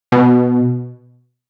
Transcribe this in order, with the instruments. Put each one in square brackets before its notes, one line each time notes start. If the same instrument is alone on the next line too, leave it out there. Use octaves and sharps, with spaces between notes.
[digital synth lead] B2